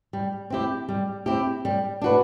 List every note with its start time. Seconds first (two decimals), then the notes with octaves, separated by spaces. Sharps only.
0.13 G3
0.50 C4 E4 G4
0.89 G3
1.26 C4 E4 G4
1.65 G3
2.02 D4 F#4 B4